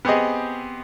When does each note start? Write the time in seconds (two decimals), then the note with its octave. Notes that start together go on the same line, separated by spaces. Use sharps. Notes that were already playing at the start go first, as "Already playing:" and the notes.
0.05 B3 C4 G4 G#4 D#5